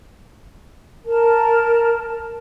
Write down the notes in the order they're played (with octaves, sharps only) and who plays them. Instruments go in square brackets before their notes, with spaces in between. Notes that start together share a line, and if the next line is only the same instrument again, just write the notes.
[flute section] A#4 A5